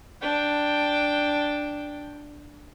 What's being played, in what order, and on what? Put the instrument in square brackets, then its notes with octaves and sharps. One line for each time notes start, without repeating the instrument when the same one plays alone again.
[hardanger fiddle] D4 G5